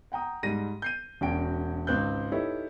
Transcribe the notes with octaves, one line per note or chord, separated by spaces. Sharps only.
F#5 G5 A#5 D#6
G#2 G3 A#6 D#7
G6 C7 D#7
E1 C#4 D4 F#4 G5 D7
G#1 C#2 C4 F#6 G6
D#4 E4 G4 A4 B4 C#5